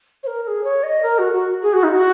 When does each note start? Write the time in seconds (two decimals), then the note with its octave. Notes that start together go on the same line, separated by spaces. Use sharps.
0.23 C#5
0.27 A#4
0.43 A#4
0.48 G#4
0.64 C#5
0.83 D#5
1.03 A#4
1.19 F#4
1.33 F#4
1.62 G#4
1.73 F#4
1.84 D#4
1.93 F#4